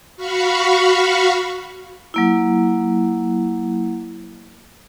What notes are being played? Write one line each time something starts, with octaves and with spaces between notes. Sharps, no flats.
F#4 F5 B5 C#6
F#3 A#3 E4